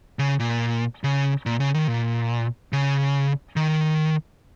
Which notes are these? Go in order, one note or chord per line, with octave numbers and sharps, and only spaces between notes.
C#3
A#2
C#3
A#2
C#3
D#3
A#2
C#3
D#3